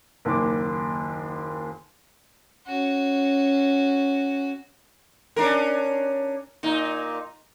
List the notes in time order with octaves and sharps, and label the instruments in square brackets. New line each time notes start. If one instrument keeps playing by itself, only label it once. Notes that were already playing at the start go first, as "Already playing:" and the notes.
[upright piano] F#1 D#2 D#3 D6
[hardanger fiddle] C#4 F#4
[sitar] C#4 D4 A#4
A#2 D#4